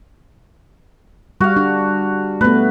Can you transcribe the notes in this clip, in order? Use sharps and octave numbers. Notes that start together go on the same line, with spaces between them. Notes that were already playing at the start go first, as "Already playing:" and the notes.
G3 F#4 F5
D4
A3 B3 B4